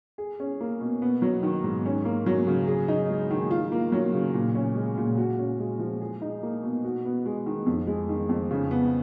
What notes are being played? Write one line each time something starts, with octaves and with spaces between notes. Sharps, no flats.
G#4
C#4
A#3
B2
B3
F#3
D#3
G#2
C#4
A#3
F#3
C#3
G#4
D#4
G#3
D#3
F4
A#3
F#3
C#3
A#2
C#4
G#3
A#2
F#4
C#4
G#3
F3
G#4
D#4
A#3
B2
F#4
B3
G#3
D#3
F2
G#3
D#3
F2
C#3
B3